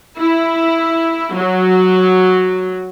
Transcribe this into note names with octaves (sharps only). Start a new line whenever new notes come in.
E4
F#3